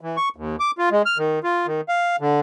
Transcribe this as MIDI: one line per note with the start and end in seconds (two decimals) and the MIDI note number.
0.01 0.17 52
0.17 0.29 85
0.36 0.56 39
0.60 0.71 86
0.78 0.89 65
0.91 1.02 56
1.06 1.18 89
1.18 1.39 51
1.43 1.67 65
1.67 1.81 51
1.89 2.16 77
2.20 2.40 50